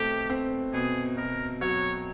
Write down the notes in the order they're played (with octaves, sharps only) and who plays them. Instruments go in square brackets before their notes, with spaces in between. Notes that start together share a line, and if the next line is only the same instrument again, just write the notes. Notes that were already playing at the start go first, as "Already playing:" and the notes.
Already playing: [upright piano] B2 A3 C4 [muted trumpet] G4
[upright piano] C4
[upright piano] B2 [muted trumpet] G#4
[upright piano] B2 [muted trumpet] A#4
[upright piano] F#3 [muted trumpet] C#5